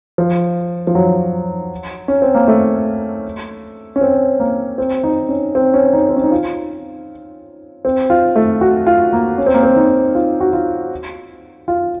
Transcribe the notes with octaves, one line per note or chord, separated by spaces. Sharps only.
F3
F3
F#3
C#4
C4
A#3
A3
C#4
C4
A#3
C4
D#4
C#4
C4
C#4
D#4
C4
C#4
D#4
F4
C4
F4
A3
F#4
F4
A#3
C#4
C4
A#3
C4
D#4
F4
F#4
F4
F4